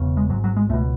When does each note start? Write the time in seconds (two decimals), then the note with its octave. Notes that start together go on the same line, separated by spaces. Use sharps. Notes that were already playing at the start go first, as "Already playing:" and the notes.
Already playing: E1 E2 C#3
0.17 G#3
0.29 G#1 G#2 F#3
0.44 F#3
0.56 G#3
0.69 C#2 A3
0.74 B2